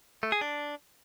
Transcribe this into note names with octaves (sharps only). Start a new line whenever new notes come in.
A3
G#4
D4